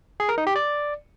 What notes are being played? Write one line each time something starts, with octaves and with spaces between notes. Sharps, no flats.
G#4
A#4
D#4
G4
D5